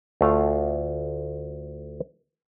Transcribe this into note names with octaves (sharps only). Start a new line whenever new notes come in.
D2 A3 F4 F5